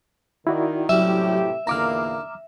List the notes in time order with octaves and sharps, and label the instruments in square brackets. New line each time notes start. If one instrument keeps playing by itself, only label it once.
[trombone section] D#3 [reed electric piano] E4 F#4 D5
[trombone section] A2 C3 G4 [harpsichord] F#3 G3 C#4 [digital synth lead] E5
[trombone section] E2 A#2 A#3 [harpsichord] D3 D#4 [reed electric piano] A#5 D6 F6